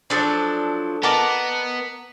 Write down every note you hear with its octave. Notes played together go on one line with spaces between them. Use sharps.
F3 F#3 D4 A4
B3 A#4 D#5 A5 D6